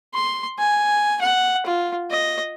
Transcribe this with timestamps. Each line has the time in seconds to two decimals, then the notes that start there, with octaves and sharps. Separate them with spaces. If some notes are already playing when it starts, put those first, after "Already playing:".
0.14 C6
0.59 G#5
1.21 F#5
1.66 F4
2.11 D#5